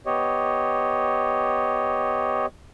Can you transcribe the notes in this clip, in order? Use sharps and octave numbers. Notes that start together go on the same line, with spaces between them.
B3 G4 C#5 D#5